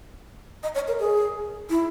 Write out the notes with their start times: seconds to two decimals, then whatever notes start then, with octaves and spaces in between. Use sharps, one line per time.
0.63 D#5
0.75 C#5
0.88 A#4
1.00 G#4
1.70 E4